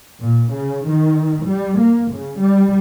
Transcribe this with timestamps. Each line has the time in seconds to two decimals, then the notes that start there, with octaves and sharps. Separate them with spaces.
0.20 A#2
0.53 C#3
0.85 D#3
1.44 G3
1.77 A#3
2.12 C#3
2.40 G3